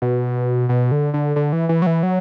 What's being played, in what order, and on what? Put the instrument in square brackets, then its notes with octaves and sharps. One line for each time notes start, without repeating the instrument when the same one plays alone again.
[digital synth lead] B2
B2
D3
D3
D3
E3
E3
F#3
E3
F#3